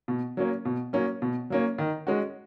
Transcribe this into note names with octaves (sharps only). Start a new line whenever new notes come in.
B2
F#3 A#3 C#4
B2
F#3 A#3 C#4
B2
F#3 A#3 C#4
D#3
G#3 C#4 F#4